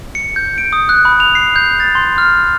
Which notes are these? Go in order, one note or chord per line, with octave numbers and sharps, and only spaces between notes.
C#7
G6
D7
D#6
F#6
B5
F7
C7
G6
A6
C6
F6